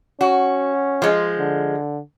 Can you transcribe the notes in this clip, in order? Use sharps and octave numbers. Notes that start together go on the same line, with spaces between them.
C#4 F#4
F3 G#3
D3